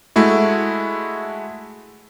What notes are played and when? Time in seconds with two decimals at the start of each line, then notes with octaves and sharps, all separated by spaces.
0.16 G#3 A3 E4 F#4